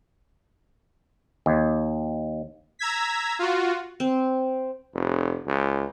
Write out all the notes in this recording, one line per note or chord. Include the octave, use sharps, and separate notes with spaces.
D#2
A#5 E6 G#6 B6
F4 F#4
C4
F1
C#2